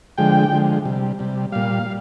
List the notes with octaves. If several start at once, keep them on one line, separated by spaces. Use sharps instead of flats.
D3 F3 G#3 G5
D3 F3 G#3
C3 G3
C3 G3
A#2 G3 F5
G3